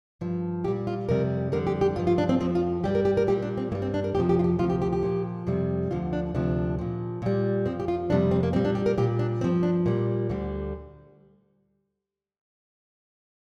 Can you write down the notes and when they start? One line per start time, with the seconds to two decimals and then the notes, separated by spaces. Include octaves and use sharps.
0.21 G2 F3
0.64 A#2 G3 G4
0.87 F4
1.09 F2 C3 G3 A#4
1.52 F2 D3 G3 A#4
1.67 G4
1.81 G4
1.96 G2 F3 F4
2.07 F4
2.18 D4
2.29 C4
2.40 F2 F3 C4
2.55 F4
2.83 G2 G3 G4
2.95 A#4
3.05 G4
3.17 A#4
3.27 A#2 G3 G4
3.42 D4
3.57 C4
3.72 G2 A#3
3.75 G3
3.82 C4
3.94 D4
4.04 A#4
4.15 F2 C3 F3 G4
4.29 G4
4.39 F4
4.44 G4
4.59 D2 C3 F3 F4
4.70 G4
4.82 G4
4.93 G4
5.03 A#2 F3
5.47 F2 C3 G3
5.91 D2 D3 F3 F4
6.13 D4
6.35 D2 C3 F3 D4
6.79 A#2 F3
7.22 A#2 G3
7.65 F2 F3 C4
7.80 G4
7.88 F4
8.10 F2 C3 G3 D4
8.31 C4
8.43 A#3
8.53 A#2 G3 C4
8.65 D4
8.75 G4
8.86 A#4
8.98 A#2 G3 G4
9.19 D4
9.41 G2 F3 C4
9.63 D4
9.86 A#2 G3
10.29 D2 D3 G3